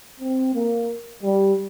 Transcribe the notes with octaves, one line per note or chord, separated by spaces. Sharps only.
C4
A#3
G3